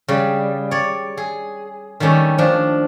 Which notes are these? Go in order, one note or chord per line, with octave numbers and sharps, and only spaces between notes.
C#3 G3
C#5 D5
G#4
D#3 G3 A3 C#4 D5
F3 D4